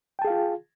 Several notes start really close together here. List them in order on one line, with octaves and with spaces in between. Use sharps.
G5 A5 G#4 F5 F4